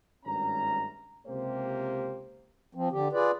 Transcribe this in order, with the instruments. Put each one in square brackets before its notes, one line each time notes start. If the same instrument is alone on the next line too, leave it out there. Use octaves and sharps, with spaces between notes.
[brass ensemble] G#1 G2 A3 C#4 A#5
C#2 C3 A#3 G4 C5
[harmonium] F3 C4
D3 G4
F4 G#4 B4 D5